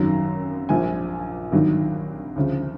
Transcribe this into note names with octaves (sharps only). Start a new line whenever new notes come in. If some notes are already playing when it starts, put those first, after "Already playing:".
Already playing: G#1 F#2 D#3 F#3 A#5
A#1 A#2 F3 G#5
G#1 G2 D#3 F#3
D2 C#3 F3